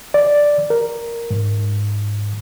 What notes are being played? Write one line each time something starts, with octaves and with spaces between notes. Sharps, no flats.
D5
A#4
G#2